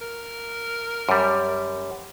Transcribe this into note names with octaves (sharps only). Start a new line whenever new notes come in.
A#4
F#2 G3